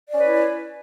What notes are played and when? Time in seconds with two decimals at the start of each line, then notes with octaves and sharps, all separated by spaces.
0.10 D5
0.14 C#4
0.19 B4
0.24 E4